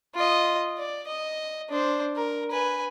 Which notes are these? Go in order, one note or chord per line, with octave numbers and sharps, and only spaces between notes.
F4 D#5
D5
D#5
D4 C5
A#4
B4 G#5